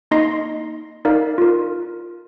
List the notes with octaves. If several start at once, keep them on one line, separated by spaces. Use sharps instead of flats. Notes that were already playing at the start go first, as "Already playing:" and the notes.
A#3 D#4 D#5 C6 A#6 C7
D#4 A#4 D5 F5
F4 A#4